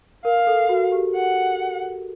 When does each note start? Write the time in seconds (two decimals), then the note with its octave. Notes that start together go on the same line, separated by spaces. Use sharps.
0.25 A#4 F5
0.47 A4
0.69 F#4
0.92 G4
1.15 F#5